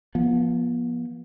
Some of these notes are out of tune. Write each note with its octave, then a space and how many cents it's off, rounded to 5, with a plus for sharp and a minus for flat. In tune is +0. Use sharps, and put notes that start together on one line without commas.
F3 -5 B3 -45